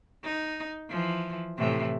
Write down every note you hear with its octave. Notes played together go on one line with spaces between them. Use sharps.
D#4
E3 F3
A2 C3 E3